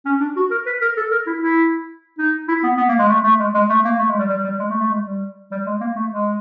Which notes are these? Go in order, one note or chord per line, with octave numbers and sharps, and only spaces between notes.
C#4
D4
F#4
A#4
B4
A#4
A4
A#4
E4
E4
D#4
E4
B3
B3
A#3
G#3
A3
A3
G#3
G#3
A3
A#3
A3
G#3
G3
G3
G3
G#3
A3
A3
G#3
G3
G3
G#3
A#3
A3
G#3